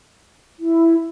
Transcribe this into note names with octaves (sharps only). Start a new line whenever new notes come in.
E4